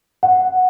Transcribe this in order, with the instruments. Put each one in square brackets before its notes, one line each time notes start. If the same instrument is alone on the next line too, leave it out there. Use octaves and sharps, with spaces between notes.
[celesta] F#5